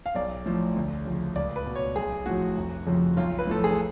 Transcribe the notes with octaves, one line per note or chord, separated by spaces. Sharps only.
F5
B1 D5
A2 F3
D2
C#3 F3
C#2 D5
B4
B2
C#5
B1 G#4
A2 F3 F#4
F1
F2 C#3 F3
B1 F4
B4
A2 F3 A4
G#4